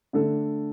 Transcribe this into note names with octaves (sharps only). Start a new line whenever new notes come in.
D3 A3 D4 A4